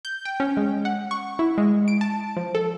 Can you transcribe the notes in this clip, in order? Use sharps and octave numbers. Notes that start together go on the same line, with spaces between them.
G6
G5
C#4
G#3
F#5
C#6
E4
G#3
D7
A5
F3
A4